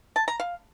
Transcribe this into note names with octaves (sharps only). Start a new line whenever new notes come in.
A5
A#5
F5